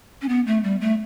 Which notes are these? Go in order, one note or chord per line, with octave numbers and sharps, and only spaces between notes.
C#4
B3
A3
G3
A3